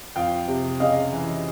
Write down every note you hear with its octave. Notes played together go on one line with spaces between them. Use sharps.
F2 F5 G5
C3
C#3 D#5 F5
E3